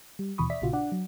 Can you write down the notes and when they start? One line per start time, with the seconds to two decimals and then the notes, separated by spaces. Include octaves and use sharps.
0.19 G3
0.38 D#2 B2 E3 B5 C#6 D#6
0.50 D5 E5 B6
0.62 A#1 A#2 C#3 F4 F#4
0.73 D4 D5 F#5
0.92 F#3